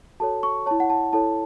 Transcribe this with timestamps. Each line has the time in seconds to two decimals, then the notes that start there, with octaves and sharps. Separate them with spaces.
0.20 F#4 A4 C#5 A5
0.43 C#6
0.66 E4 C#5 A5
0.80 F#5
0.90 A5
1.13 E4 A4 C#5 A5